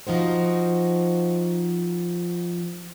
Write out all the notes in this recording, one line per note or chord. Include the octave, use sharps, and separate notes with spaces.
F3 D#4 F#4 C5